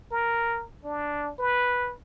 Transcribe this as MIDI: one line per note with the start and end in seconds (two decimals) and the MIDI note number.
0.11 0.65 70
0.85 1.32 62
1.39 1.93 71